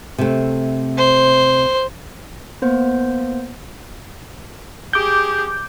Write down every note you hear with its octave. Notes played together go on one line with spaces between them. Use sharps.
C3 A3
C5
A#3 B3 C5
G4 G#4 D6 G6